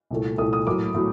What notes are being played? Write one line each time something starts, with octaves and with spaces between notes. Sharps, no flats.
C2 A#2 A3
C2 A#2 A3 D#6
D#6
A2 F#3 A#3 D6
A2 F#3